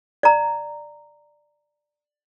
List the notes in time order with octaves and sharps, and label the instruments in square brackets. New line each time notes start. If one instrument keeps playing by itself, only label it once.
[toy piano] D5 A#5